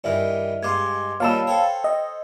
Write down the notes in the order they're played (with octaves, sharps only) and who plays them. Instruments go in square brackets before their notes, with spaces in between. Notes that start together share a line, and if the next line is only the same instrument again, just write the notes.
[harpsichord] G2 D#3 E3 [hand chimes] D5 E5 F6
[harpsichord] G2 G#3 F5 [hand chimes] C6 D6 G#6
[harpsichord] A#1 D#3 G3 [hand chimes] C#5 B5 [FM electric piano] F5 A5 E6
[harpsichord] A4 C5 C#5 [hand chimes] G5
[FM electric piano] D#5